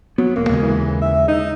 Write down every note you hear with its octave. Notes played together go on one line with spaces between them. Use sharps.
F#3 B3
E1 A#3
D#2 C#3 G#3
E3
E5
D#4